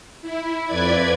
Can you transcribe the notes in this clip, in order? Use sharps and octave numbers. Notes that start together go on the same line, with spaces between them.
E4
F2 B4 D5 G#6